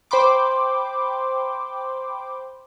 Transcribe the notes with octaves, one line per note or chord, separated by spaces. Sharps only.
C5 G5 B5 C6 D6